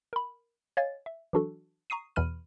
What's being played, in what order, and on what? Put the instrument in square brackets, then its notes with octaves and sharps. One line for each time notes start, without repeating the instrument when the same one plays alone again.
[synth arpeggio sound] A#4 B5
C#5 D#5 F5 G#5 A6
E5
E3 F#3 D4 F#4 A4
A#5 C#6 D#6 C7 D#7
E2 B2 E3 B5 F6 D#7